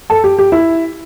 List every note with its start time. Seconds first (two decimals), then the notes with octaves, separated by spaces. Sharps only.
0.10 A4
0.24 G4
0.39 G4
0.52 E4